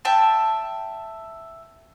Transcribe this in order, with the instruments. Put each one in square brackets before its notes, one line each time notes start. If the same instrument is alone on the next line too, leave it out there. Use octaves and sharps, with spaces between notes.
[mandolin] E5 G5 A5